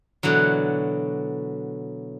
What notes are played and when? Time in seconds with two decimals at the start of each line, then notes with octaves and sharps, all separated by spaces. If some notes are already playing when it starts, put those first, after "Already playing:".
0.23 B2 D3 E3 F#3